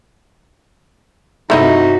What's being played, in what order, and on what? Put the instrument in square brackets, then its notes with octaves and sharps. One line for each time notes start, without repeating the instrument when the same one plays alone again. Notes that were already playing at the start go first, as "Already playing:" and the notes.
[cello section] G2 C3 F#4 [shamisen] A3 E4 D#5 [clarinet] D#4